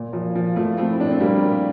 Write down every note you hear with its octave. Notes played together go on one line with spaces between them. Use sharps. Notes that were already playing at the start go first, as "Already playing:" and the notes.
Already playing: A#2
A#2 F3
A#2 F3
A#2 F3 A3
A#2 A3 C4
E4
A#2 D4
C4
A#2 G3 A#3
A#2